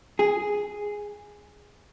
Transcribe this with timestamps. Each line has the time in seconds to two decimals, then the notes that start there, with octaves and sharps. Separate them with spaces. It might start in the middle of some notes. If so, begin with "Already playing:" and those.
0.19 G#4